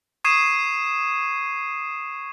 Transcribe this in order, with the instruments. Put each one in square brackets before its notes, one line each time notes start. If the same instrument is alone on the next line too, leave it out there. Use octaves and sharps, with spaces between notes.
[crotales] C#6 D#6 G#6 C7 D#7 E7